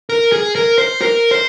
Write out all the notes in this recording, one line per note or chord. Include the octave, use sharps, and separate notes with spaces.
A#4
G#4
A#4
C5
A#4
C5